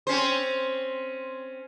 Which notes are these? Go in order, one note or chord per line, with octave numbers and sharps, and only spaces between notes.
C4 C#4 C5